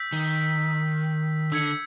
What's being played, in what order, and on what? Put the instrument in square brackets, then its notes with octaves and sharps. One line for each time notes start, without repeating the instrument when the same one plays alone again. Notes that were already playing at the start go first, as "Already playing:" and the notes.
Already playing: [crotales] E6 G6 B6
[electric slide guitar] D#3
[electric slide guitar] D3 [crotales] E6 G#6 C#7